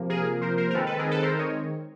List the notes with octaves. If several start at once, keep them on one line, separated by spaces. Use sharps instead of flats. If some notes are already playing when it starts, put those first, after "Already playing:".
Already playing: C3 F3 A#3
G#4 A#4
A#4 C5
A#4 C5
A#4
D#3 G#3 C4 D#4 A4 B4
A4 B4
G#4 A#4
A4 B4
A#4 C5
C#5 D#5